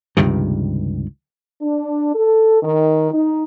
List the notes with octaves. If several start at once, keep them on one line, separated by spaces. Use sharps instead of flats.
C#2 G2 C3 D#3
D4
A4
D#3
D#4